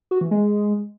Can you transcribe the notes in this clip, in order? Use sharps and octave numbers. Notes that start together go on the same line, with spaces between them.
F#4
E3
G#3